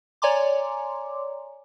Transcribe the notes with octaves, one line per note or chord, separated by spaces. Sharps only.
C#5 D5 G#5 A#5 C6 D6